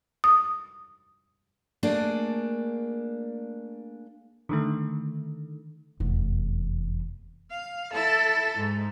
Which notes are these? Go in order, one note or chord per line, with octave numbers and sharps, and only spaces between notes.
D#6
A3 A#3 D4 G#4
D3 D#3 A3
F1 E2
F5
E4 A4
G#2